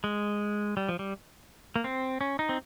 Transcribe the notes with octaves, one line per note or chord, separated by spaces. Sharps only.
G#3
G3
F3
G3
A#3
C4
C#4
D#4
C4